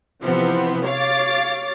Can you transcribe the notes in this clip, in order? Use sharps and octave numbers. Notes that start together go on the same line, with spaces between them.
C3 E3 F3 B3 C4
C#5 F5 D6 A6